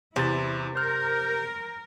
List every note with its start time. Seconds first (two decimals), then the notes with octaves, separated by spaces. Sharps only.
0.16 E2 C3 E4 A6
0.75 A#4 C5 F6 G6